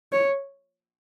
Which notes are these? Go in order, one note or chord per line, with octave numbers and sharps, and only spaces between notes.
C#5